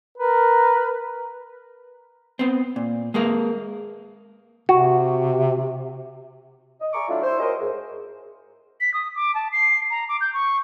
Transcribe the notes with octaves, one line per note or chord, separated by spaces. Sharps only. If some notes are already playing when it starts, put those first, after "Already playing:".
A#4 B4
B3 C4
A#2
G#3 A#3 G#4 A#4
C3 F#4
D#5
D5 E5 G#5 A#5 C#6 D6
F#3 A3 D4 E4 F4
E4 C5
F#4 G#4 A#4 C5 C#5 D#5
G#2
B6
D#6
D6
A5
C7
A#5
D6
G6
C#6